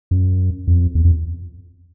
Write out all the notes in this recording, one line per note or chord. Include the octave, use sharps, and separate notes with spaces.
F#2
F2
E2
F2